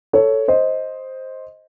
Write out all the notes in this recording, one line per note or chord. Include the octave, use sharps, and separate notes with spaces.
A4 C#5
C5 D#5